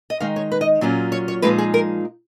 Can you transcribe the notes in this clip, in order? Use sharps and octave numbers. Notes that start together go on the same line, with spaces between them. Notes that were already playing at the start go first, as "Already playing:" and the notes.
D#5
D#3 G#3 D#4 F5
C#5
B4
D#5
A#2 F#3 C#4 F4
C#5
C#5
A#2 F3 G#3 D#4 B4
G#4
A#4